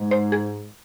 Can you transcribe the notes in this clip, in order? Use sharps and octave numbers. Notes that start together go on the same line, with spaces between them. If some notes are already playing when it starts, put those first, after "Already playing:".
Already playing: G#2
C5
G#4